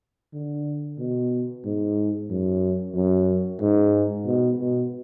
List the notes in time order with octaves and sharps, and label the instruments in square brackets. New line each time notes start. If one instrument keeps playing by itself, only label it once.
[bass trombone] D3
B2
G#2
F#2
F#2
G#2
B2
B2